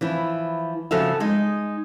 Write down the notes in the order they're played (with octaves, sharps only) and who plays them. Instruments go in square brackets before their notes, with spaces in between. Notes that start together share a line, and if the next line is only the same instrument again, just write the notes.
[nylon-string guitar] E3 F3 E4
C#3 F3 F#4 A4 E5 F5
G#3 D#4